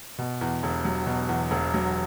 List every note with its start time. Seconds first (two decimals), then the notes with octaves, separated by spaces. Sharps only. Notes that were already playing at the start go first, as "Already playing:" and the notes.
0.18 B2
0.41 E2
0.63 E1
0.85 F#3
1.06 B2
1.29 E2
1.51 E1
1.74 F#3